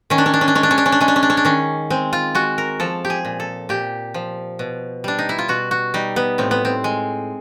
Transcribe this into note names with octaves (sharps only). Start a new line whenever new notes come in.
D#3 C#4
D4
C#4
D4
C#4
D4
G#3 C#4
D4
C#4
D4
C#4
D4
G#3 C#4
D4
C#4
D4
C#4
D4
D#3 C#4
G#3 C4
F4
G#3 F#4
A#4
F3 A4
G4
G#4
A#2
A4
A#2 G4
F3
B2
G3 D4
D#4
E4
F4
B2 F#4
F#4
G3 D#4
B3
A2 C4
B3
C4
G#3